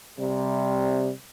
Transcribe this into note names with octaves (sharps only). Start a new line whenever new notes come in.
C3 G3